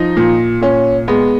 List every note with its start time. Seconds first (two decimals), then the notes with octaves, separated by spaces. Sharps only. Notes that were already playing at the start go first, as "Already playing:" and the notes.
Already playing: F3 D#4
0.17 A#2
0.61 A#2 C#4
1.08 G#3 B3